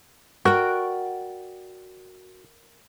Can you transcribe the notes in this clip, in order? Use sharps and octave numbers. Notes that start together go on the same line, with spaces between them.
F#4 A#4 D5 G5